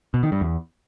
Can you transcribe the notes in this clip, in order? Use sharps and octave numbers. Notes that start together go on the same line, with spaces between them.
B2
D#3
G2
E2